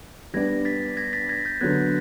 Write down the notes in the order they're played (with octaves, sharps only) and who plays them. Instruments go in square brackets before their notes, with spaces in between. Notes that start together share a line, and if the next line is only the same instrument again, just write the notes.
[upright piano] G3 B3 D4 [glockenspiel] G#6 A#6
[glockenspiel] A6 B6
G#6 A#6
A6 B6
G#6 A#6
G6 A6
[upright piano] D3 F#3 B3 [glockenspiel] F#6 G#6